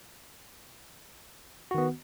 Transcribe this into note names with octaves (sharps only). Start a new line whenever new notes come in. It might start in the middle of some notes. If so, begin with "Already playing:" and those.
D#3 B3 F#4